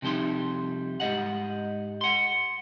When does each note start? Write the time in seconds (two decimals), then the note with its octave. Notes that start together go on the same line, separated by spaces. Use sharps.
0.02 C3 F3 G3 D#4 C6
1.00 G#2 G4 D#5 F#5
2.01 F#5 C6